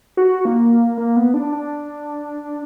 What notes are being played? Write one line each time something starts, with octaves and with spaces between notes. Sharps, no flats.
F#4
A#3
A#3
B3
D4
D4